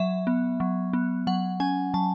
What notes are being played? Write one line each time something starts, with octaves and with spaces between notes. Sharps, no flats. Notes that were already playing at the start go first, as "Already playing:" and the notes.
Already playing: F#3 E5
B3
F#3
B3
F#3 F#5
C#4 G#5
F#3 A5